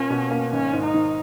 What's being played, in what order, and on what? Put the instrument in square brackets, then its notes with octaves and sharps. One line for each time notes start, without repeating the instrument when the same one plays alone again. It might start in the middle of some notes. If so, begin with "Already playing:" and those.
Already playing: [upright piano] B2 A#3 F4 A#4 [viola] C#4
[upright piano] B2
A#3
[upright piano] G#1 [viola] C#4
[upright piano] G#2
[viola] D#4
[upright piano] D#3